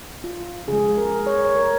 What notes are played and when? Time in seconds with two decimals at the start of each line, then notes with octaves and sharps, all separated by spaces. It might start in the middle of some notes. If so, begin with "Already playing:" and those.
0.24 F4
0.68 C#3 F3 G#3 G#4
0.98 A#4
1.27 C#5
1.45 C#5
1.56 A#4